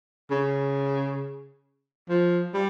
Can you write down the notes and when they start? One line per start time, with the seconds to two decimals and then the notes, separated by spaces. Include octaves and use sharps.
0.30 C#3
2.09 F3
2.54 G3